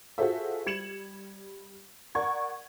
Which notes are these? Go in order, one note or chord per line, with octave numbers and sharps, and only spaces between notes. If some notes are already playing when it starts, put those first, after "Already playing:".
F4 F#4 G#4 A4 C5 E5
G3 G#6 C#7 E7 F#7
A#4 D5 F#5 C#6 G#6